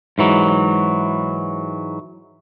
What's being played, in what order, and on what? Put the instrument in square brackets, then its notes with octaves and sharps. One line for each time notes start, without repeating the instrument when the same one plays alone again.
[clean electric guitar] G#2 E3 F#3